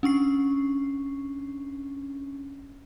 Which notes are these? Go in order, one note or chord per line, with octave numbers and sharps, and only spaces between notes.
C#4 D4 C#6 C7